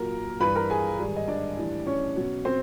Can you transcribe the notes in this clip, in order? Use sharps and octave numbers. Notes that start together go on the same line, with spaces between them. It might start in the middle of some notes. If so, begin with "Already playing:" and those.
Already playing: A#2 F#3 A#4 A#5
G2 E3 G3 B4 B5
A#4 A#5
G#4 G#5
G#2 D#3 G3
D#5
D4 D5
A2 E3 G3
C#4 C#5
B2 F#3
C4 C5